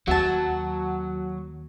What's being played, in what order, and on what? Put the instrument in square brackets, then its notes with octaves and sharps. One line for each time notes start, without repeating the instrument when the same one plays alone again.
[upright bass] D#2 [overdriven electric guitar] F#3 [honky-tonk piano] F#4 [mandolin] E5 A5